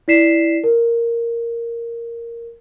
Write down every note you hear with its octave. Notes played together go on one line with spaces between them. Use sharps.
E4 D5 B6 C7 E7
A#4